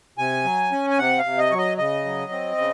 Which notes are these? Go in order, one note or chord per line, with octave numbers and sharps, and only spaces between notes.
C3 G#5
F#3
C#4
G#5
C3 F#5
F5
C3
D#5
F#3 C#5
D#5
C#3 D#5
F#3
C4
C#3